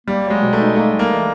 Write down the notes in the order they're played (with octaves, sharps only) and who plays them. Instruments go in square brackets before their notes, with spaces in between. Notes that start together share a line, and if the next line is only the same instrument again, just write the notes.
[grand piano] G3 [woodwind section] A#3
[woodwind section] F#3
[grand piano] G#3
[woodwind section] B2
[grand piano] A3
[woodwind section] D#4
[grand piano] A3 [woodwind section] A#3
[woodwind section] G3
[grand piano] A#3
[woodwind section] E3